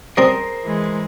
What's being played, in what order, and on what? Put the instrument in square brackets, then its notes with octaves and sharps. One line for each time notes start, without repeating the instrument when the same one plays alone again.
[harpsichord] G3 C4 D#6 [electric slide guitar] G#4 A#4 C5
[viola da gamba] E3 G#3